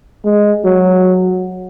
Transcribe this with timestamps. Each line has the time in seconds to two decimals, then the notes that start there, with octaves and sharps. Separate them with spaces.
0.25 G#3
0.64 F#3